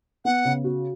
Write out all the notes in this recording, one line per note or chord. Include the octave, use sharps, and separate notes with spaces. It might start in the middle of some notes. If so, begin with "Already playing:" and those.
B3 F#5
C#3
F#4